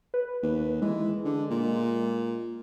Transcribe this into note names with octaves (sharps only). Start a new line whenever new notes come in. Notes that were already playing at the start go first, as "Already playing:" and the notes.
B4
D#2
E3 G#3
D3
A#2